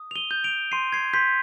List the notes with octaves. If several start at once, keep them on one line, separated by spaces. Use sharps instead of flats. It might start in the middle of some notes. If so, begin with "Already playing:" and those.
Already playing: D#6
F7
D#7 G7
G6
D7 F7
C6 C7 D#7
G#6 C7
C6 G6 B6